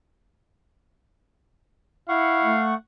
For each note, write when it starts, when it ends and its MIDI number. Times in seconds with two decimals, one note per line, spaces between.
2.09 2.55 64
2.09 2.64 77
2.09 2.74 78
2.09 2.74 85
2.43 2.74 57